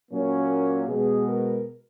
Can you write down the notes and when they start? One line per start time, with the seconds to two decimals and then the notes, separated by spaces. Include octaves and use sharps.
0.11 A#2 F#3 A#3 C#4
0.88 B2 G#3 B3 G#4
1.27 A#4